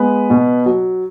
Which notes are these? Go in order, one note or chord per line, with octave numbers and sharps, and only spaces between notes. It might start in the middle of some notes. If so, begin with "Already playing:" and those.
Already playing: G#3 B3 B4
B2
F#3